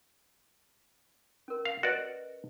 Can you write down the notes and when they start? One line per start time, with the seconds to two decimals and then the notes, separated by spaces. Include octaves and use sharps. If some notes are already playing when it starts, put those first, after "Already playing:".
1.48 C#4 A#4
1.65 F5
1.83 F#4 B4 D5 D#5